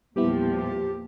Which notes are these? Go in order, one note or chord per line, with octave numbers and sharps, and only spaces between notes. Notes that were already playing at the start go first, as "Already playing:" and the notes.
E2 A#2 F3 G3 B3 E4 G4